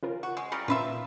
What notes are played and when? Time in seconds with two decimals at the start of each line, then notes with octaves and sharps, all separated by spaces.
0.03 C#3 F4 A#4
0.23 F#4
0.37 G#3
0.52 C#3 G3 F4 A#5
0.68 A#2 C#4 F4 B4 E5